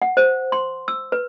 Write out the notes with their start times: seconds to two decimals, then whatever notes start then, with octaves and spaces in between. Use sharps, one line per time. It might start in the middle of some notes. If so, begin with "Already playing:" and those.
0.02 F#5
0.17 C5
0.52 C6
0.88 E6
1.12 B4